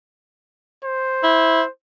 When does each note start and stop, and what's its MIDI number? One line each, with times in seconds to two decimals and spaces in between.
0.84 1.69 72
1.23 1.62 64